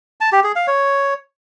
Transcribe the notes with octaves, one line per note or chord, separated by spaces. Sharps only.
A5
G4
G#4
F5
C#5